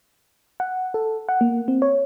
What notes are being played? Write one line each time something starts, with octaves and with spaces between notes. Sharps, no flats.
F#5
A4
F#5
A#3
C4
C#5